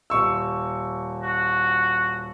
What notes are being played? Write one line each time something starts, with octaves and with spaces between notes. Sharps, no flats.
D#1 C#6 E6
F#4